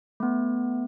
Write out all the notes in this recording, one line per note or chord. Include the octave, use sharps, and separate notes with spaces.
A3 B3